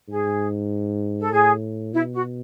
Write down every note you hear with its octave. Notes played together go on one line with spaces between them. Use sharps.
G#2 G#4
A4
A2 G#4
B2 E4
F#4